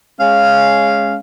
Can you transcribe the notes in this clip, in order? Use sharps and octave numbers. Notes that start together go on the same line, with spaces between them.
G#3 C#4 F5